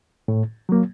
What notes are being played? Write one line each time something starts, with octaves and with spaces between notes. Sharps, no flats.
A2
F#3 A#3